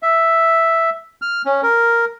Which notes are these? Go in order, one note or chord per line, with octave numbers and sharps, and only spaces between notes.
E5
F6
C#4
A#4